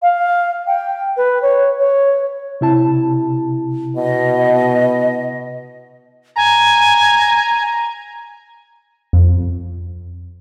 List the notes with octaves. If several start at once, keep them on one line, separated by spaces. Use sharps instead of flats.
F5
G5
B4
C#5
C#5
C3 E4 A5
B2 D#5
G#5 A#5
F2